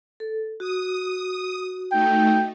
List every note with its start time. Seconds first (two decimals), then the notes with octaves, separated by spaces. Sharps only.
0.20 A4
0.60 F#4 D#6
1.92 A3 D#4 G5